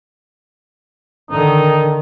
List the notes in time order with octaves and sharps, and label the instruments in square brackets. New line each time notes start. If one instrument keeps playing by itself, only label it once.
[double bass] D3 D#3 [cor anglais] D#4